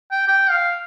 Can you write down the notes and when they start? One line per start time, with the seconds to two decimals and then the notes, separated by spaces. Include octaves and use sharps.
0.11 G5
0.27 G5
0.50 F5